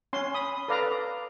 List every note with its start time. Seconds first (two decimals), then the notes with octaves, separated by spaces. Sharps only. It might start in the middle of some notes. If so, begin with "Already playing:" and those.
0.13 C#4 C6
0.34 B5 D#6
0.68 A4 B4 D5 F5 A#5